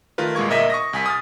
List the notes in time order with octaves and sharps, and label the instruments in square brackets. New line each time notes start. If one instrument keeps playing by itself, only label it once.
[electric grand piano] D#3 A3 F4 A#4 B4
C2 A#2 G#3 C#6 G#6
G1 A#2 A#4 D#5 E5 B6
C#6 D#6 A#6
C2 G#5 B6
D#6 F6 A6